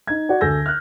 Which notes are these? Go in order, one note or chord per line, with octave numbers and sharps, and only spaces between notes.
D#4 G#6
F#4 D5 F#5
D2 A4 G#5 E6 G6 A#6
F6 F#6